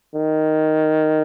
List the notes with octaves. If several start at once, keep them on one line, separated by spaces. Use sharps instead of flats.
D#3